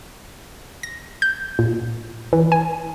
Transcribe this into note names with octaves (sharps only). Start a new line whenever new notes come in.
A#6
G6
A#2
E3
G#5